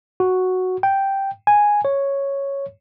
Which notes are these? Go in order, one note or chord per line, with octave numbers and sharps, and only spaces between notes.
F#4
G5
G#5
C#5